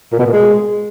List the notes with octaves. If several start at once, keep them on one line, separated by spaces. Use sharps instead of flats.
A#2
B2
A#2
G#3